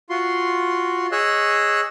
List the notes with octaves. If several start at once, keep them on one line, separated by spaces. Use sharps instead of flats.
F4 F#4 C6
G#4 C#5 D#5 E6 F#6